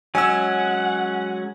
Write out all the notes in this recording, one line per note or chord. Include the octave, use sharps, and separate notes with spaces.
F#3 G#3 C#4 F#5 G#5 E6